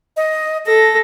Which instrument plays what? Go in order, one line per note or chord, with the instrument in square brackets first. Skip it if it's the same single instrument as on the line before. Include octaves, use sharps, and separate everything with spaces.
[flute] D#5
[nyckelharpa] A4 [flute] A#6